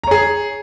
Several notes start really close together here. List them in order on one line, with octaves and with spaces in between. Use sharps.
A#5 C#5 G#4